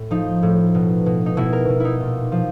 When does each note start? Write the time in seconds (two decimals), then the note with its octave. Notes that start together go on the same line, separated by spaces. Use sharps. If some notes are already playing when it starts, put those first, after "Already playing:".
Already playing: A2
0.11 F3 D#4
0.43 A2
0.75 B2
1.06 B2
1.26 D#4
1.37 B2 E4
1.53 A#4
1.69 B2
1.80 D#4 E4
2.01 A#2
2.32 F3